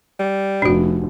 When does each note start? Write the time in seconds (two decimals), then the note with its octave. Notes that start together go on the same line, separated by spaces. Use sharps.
0.19 G3
0.62 F1 D4 F#4